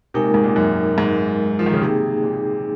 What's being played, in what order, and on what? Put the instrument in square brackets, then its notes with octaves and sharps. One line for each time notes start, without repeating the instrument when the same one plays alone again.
[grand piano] C3 [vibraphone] G#3 D#4 A#4
[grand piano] A#2
G#2
A#2
F#2
G#2
F3
D#3
C#3
[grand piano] C3 [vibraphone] A#3 D#4 G#4
[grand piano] A#2